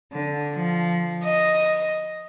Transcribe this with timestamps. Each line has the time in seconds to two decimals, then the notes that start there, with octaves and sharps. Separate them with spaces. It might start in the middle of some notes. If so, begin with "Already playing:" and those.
0.11 D3
0.53 F3
1.24 D#5